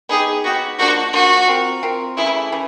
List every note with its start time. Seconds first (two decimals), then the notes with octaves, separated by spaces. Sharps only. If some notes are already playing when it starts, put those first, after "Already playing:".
0.09 B3 D#4 G4 G#4
0.44 B3 D#4 F#4 G4
0.78 F3 A#3 D4 F#4
1.13 F3 A#3 D4 F#4
1.48 C4 F4 A#4
1.83 C4 F4 A#4
2.17 C#3 E3 A3 E4
2.52 C#3 E3